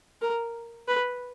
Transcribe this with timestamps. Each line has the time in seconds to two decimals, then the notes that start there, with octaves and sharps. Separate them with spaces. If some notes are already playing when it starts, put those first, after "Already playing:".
0.22 A#4
0.88 B4